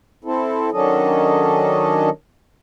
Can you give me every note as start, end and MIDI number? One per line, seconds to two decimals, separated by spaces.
0.24 0.70 60
0.24 0.70 64
0.24 0.70 69
0.72 2.10 51
0.72 2.10 54
0.72 2.10 61
0.72 2.10 62
0.72 2.10 69
0.72 2.10 75